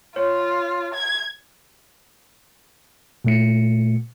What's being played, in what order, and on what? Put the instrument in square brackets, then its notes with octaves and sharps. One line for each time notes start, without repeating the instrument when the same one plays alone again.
[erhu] F4 [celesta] C#5
[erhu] G#6
[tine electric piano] A#2 A3 C#7